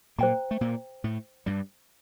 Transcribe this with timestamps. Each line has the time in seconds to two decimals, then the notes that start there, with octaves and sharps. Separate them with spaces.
0.18 A#2 A#3 C5 G5 A#5
0.51 A3
0.61 A#2 A#3
1.04 A2 A3
1.46 G2 G3